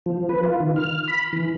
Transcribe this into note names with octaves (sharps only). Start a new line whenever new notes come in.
F3
B4
F4
D#3
F6
B5
E3